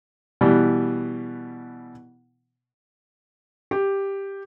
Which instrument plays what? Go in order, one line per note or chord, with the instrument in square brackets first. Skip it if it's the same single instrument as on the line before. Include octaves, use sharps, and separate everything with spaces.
[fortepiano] B2 E3 G3
[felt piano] G4